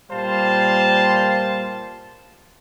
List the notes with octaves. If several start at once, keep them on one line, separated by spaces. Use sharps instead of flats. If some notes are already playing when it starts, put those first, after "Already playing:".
A#2 G3 C5 F5 A5